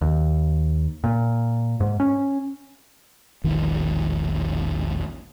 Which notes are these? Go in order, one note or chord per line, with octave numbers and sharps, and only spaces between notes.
D#2
A#2
G#2
C#4
E1 A#1 D#3 E3